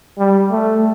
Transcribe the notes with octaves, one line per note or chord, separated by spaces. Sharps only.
G3
A3